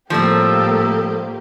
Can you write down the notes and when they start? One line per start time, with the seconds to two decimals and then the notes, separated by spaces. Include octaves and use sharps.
0.10 A2 F3 G3 A#3 C4 G4 A4